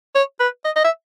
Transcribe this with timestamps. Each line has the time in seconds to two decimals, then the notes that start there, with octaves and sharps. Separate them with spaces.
0.15 C#5
0.40 B4
0.65 D#5
0.76 D#5
0.84 E5